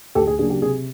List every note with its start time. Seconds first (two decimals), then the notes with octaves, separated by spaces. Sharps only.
0.15 D2 G4 A4
0.27 G#4
0.39 C#3 F#3 A#3 D4 G#4
0.50 G4
0.62 C3 G#4